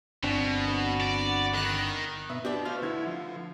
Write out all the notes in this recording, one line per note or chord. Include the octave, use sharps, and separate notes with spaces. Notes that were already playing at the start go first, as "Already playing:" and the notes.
G1 B2 C4 D4
B3 F#4
D5
D#3 F#6
B2 B3 E5
B2 D4 G4 C5 D5 E5
A3 C5 F5 F6
D3 E4 G#6
F3